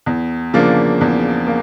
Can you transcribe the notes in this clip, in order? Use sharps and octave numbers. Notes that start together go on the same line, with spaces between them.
E2
C#3 F3 A#3 D4
E2
A#3